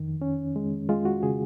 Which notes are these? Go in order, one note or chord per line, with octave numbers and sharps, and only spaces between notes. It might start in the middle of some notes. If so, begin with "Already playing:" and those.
Already playing: F2 D#3
C#4
G#3
G#3 F4
F#4
C#3 G#4